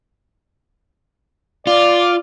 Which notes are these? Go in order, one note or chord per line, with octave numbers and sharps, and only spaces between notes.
F4 D5